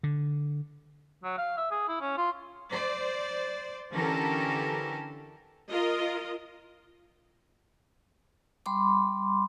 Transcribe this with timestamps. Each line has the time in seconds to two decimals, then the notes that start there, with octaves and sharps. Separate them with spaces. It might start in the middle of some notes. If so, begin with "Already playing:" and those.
0.03 D3
1.23 F#3
1.38 F5
1.57 E5
1.71 G#4
1.88 E4
2.01 C#4
2.17 F4
2.71 C5 D5
3.92 D3 E3 C#4 G4 A4 A#4
5.70 F4 A#4 D#5
8.66 G3 B5 C6 D6